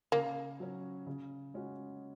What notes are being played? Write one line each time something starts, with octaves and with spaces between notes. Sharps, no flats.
C#3 A#3
F#3 C#4
C#3
G#3 C#4 F#4